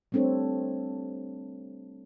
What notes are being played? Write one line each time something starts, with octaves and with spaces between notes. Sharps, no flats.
G3 A3 C4 D4 A4 C#5